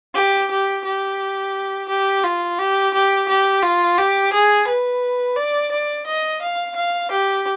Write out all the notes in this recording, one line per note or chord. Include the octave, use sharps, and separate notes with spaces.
G4
G4
G4
G4
F4
G4
G4
G4
F4
G4
G#4
B4
D5
D5
D#5
F5
F5
G4